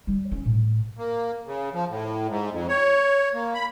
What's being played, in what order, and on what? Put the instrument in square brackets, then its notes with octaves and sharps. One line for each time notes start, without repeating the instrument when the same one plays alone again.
[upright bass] G3
C#4
A2
[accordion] A#3
C#3
F3
A2
G#2
F2
C#5
A#3
B5